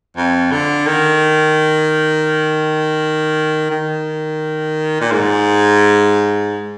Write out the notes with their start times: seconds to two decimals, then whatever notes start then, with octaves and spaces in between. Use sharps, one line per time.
0.17 F2
0.52 D3
0.87 D#3
3.71 D#3
5.01 A#2
5.12 G#2